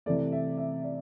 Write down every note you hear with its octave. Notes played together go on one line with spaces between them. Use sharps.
C3 E3 A3 D5
E5
E5
D5